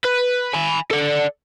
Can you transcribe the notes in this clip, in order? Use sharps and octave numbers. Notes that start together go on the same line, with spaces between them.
B4
G#5 B5
A4 D5